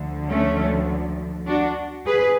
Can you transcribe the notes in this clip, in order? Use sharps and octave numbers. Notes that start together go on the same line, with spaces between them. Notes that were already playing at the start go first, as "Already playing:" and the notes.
Already playing: D2 D3 F3
A3 C#4
D4 F#4
D3 F3 G#4 B4